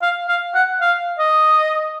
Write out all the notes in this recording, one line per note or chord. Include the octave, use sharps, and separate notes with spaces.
F5
F5
F#5
F5
D#5